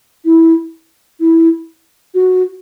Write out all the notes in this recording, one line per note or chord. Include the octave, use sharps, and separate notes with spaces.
E4
E4
F#4